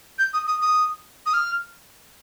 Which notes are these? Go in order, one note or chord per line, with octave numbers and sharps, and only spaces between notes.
G6
D#6
D#6
D#6
D#6
F6